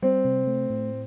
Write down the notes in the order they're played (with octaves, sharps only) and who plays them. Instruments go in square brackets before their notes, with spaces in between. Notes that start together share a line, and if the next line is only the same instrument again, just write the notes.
[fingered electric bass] G3 [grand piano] C4
[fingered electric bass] C3
A3
A2